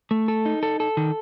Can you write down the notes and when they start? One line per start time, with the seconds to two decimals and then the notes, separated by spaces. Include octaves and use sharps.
0.11 A3
0.28 A4
0.45 D#4
0.63 A4
0.80 A4
0.97 D#3